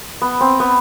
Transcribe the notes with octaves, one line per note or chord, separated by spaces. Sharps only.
B3
C4
B3